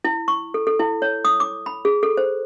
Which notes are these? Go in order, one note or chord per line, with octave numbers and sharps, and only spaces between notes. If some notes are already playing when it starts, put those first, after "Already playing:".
E4
C#6
A4
A4
E4
C#5
D#6
D6
B5
G#4
A4
C5